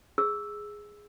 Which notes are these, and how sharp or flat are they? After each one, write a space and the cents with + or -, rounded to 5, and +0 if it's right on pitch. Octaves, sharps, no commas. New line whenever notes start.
G#4 +0 E6 +0